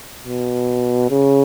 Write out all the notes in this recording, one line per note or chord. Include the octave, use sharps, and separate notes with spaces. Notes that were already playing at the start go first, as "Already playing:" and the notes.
B2
C#3